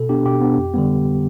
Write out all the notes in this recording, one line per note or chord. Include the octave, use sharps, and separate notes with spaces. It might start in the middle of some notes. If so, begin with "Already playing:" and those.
Already playing: B2 A4
B3 D4 G4
B2 G4
B3 D4
F2
D3 G3 B3